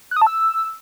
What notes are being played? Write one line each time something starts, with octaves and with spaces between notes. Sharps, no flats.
F#6
D#6
A5
E6